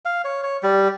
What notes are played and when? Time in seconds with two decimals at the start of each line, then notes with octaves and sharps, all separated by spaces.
0.05 F5
0.24 C#5
0.43 C#5
0.63 G3